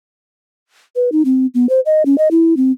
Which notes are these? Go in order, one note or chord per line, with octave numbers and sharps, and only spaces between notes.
B4
D#4
C4
B3
C5
D#5
C#4
D#5
E4
C4